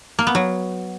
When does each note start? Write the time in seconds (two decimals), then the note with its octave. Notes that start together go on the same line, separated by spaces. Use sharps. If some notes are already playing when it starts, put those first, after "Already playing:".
0.19 A#3
0.27 B3
0.35 F#3